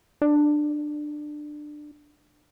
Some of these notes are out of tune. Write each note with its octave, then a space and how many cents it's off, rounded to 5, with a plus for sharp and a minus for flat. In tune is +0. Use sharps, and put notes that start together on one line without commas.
D4 +20